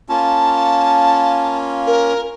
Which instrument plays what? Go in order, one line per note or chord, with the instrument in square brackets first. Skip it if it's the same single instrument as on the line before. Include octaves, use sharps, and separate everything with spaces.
[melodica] A#3 C#4 F4 [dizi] A5
[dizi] A#4